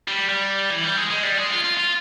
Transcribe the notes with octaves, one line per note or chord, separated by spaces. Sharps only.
G3
G3
E3
G3
G#3
G#3
G3
G#3
F4
F4
F4